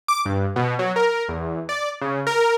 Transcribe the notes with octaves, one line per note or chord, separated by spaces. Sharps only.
D6
G2
B2
F#3
A#4
E2
D5
C#3
A#4